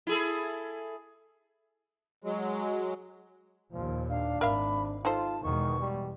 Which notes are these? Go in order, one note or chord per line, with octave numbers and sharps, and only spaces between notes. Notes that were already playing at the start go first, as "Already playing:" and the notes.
E4 G#4 A4
F#3 G#3
D#2 A#2 F3
D4 F5
G#1 A#4 E5 F5 B5
D#4 F4 A4 C5 A5
E2 B2 D#3 G#3 C#6
G3